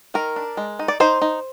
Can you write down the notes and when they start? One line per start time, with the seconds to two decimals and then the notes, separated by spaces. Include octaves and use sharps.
0.14 D#3 A#4
0.36 D4
0.57 G#3
0.79 D#4
0.88 D5
1.00 D#4 C5
1.22 D#4